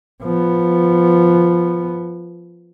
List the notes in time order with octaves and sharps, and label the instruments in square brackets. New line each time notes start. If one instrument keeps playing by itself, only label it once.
[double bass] F3 B3